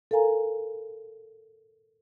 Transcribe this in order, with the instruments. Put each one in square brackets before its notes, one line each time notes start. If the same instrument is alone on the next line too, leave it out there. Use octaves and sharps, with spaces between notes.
[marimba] A4 A#4 F5 G#5 A#5